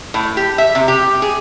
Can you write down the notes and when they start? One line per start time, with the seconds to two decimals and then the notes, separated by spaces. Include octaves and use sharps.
0.14 A2
0.37 G4
0.58 E5
0.75 C3
0.88 G4
1.22 G#4